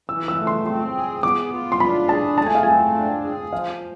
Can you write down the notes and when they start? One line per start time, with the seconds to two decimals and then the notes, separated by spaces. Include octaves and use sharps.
0.09 E3 E6
0.28 E6
0.37 A3
0.47 C6
0.66 C4 C6
0.95 G#4
1.23 B3 D6
1.53 F4
1.72 C6
1.80 D4 B5
2.09 G#4 A5
2.38 A3 A5
2.47 G#5
2.55 F5
2.63 C4 G#5
2.95 D4
3.23 G#4
3.52 F3 F5